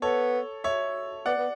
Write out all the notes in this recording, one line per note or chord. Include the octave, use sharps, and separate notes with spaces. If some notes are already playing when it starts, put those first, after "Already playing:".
B3 A4 C#5
C#5 E5
B3 D5 F#5
B3